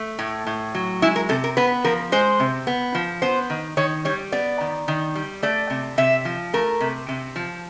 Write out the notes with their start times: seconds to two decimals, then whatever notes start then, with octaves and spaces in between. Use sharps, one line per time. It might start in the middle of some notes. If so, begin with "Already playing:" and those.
Already playing: A3
0.19 A2
0.47 A2
0.75 F#3
1.02 G#3 E4
1.16 A#4
1.29 C3 A4
1.44 A#4
1.57 B3 B4
1.85 F3 A#4
2.12 G#3 C5
2.40 C3
2.67 B3
2.95 F3
3.22 B3 C5
3.50 D#3
3.77 D#3 C#5
4.05 G3 C#5
4.32 B3 D5
4.61 D#3
4.88 D#3
5.15 G3
5.43 A3 D5
5.70 C3
5.98 C3 E5
6.25 F3
6.53 A3 A#4
6.81 C3
7.08 C3
7.36 F3